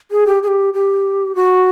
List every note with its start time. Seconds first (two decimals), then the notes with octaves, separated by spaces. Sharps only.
0.11 G#4
0.27 G4
0.43 G#4
0.48 G4
0.74 G4
1.35 F#4